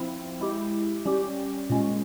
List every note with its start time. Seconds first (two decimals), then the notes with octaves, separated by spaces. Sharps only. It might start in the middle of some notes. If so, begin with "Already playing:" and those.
Already playing: F3 C4 E4
0.40 G#3 E4 G4
1.06 G3 C#4 G4
1.70 A#2 G#3 C#4